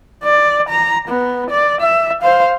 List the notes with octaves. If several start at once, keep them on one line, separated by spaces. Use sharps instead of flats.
D5
A#5
B3
D5
E5
C5 F5